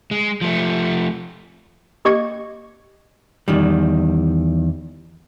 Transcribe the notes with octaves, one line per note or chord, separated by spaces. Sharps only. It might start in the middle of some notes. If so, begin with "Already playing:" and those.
G#3
F3 A3
A#3 G4 D#5 C#6 G#6 C#7
E2 D#3 G3